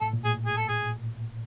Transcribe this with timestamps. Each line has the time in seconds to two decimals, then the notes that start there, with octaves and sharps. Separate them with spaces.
0.01 A2 A4
0.13 A#2
0.25 A2 G#4
0.46 G#4
0.57 A4
0.69 G#4